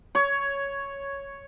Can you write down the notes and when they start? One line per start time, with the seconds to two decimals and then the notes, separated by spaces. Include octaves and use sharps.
0.15 C#5